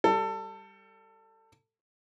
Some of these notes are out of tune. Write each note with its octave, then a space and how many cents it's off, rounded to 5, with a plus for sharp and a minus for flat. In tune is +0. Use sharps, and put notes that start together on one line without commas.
G3 +0 A4 +25